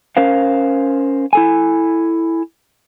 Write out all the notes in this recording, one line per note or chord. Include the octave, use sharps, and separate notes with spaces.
C#4 A#4 C5 F5
E4 A4 G#5